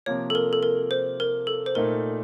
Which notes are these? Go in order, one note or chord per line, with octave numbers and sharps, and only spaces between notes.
C3 F3 A#3 C#5
A4
A#4
A4
A#4
C5
A#4
A4
C5
A#2 A3 D#4 A#4